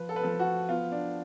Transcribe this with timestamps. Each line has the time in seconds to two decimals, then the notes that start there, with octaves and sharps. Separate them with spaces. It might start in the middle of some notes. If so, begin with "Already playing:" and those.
Already playing: F3 B4
0.09 A4
0.16 B4
0.23 F3 A4
0.39 F#4
0.69 B3 F4
0.92 D4